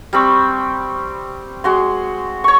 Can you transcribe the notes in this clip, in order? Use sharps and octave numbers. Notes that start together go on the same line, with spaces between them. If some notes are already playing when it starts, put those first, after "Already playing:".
G3 C4 B5 C#6
G#3 F#4 C6
C#5 C#6